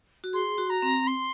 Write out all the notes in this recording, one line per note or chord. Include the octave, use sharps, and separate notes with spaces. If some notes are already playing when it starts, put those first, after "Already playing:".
F#4
G#4 C6
F#4
A#5
C4
C6